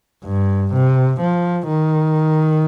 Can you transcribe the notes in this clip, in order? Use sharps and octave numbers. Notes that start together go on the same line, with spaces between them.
G2
C3
F3
D#3